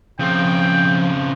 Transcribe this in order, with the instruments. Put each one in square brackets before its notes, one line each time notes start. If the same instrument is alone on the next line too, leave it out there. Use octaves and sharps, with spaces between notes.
[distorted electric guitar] C#3 C4 [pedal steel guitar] F3 [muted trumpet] G5